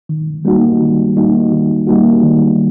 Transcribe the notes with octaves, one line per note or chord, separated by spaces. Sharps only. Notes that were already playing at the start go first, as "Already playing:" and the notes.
D#3
G3 A#3 D#4 F#4
D#3
G3 A#3 D#4 F#4
D#3
G3 A#3 D#4 F#4
D#3